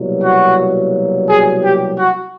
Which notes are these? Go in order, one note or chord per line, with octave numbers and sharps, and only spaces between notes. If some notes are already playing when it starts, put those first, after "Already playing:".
Already playing: C2 B2 F#3 A#3
F#4
G#4
G4
F#4